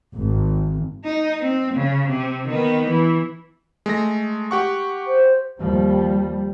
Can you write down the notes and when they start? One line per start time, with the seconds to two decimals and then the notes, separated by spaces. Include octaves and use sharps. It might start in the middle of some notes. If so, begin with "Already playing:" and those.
0.15 G#1
1.05 D#4
1.41 C4
1.74 C#3
2.08 C3
2.48 D#3 B3
2.88 E3
3.86 G#3 A3 A#6
4.51 G4 F#5 C#6
5.07 C5
5.60 D#2 F3 G3